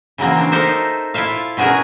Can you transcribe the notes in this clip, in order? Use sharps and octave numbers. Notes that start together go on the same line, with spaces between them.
C#3 E3 F#3 A#3 C4
C4 D4
D#4 A4 A#4 C5 E5
E4 F4 A4 E5 F5
B2 C#4 F#4 G#4 A#4